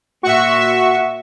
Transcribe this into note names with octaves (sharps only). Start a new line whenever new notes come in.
A#2 F#4 E5 C#6